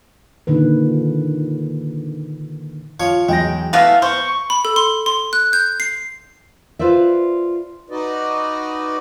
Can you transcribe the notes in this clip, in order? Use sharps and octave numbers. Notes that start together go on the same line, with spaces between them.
A#2 D3 D#3 B4
F3 C#5 C#6
E2 F#3 G#3 G5 A#6
E3 A3 B3 F5 A#6
B3 C5 C#6
B5
A4
C6
C6
F#6
G6
C7
F4 B4 C5 D5 E5
D#4 F#4 B4 D5 D#5